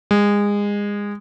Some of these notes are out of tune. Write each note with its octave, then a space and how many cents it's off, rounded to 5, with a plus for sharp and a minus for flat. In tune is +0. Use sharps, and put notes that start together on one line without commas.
G#3 -25